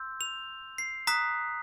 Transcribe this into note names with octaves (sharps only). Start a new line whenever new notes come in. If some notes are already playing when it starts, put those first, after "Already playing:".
Already playing: C6 E6 G6
F7
C7
A#5 D#6 F#6 B6